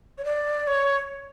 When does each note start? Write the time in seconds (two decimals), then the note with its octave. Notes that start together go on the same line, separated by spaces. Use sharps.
0.18 C#5
0.24 D5
0.67 C#5